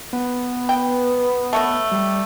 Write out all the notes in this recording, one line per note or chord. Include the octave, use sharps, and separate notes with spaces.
B3
G5
A3 C#5 D#5
G3